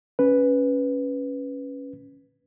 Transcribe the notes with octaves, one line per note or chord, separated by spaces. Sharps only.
C#4 B4